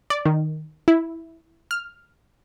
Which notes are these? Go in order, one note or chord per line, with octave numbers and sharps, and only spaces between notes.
D5
D#3
E4
F6